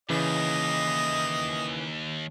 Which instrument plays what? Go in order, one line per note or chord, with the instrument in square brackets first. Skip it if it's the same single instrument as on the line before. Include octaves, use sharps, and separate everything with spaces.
[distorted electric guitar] D#2 [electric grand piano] C#3 E3 [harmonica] D#5